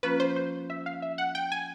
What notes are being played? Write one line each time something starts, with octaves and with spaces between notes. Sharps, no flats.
F3 A#3 C#4 F4 B4
C5
C5
E5
F5
E5
F#5
G5
G#5